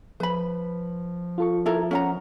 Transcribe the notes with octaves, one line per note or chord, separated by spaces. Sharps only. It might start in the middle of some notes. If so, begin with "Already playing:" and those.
F3 B4 B5
F4 A4 C#6
E4 F4 A4 A#4
C#4 F#5 A#5